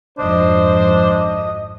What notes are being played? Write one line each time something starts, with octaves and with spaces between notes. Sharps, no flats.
G#1 F2 D4 C5 D#5